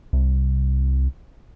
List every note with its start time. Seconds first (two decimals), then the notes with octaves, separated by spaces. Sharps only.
0.13 C2